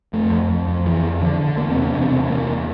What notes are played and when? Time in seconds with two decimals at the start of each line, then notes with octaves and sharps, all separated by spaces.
0.13 F2 A3
0.31 F2
0.49 F2
0.67 F2
0.86 F2 E3
1.03 F2
1.21 D3
1.39 D3
1.57 E2 A#3
1.70 C4
1.75 C3
1.81 D4
1.93 E2 C4
2.01 D4
2.08 C4
2.12 C3
2.29 E2 A#3
2.47 E2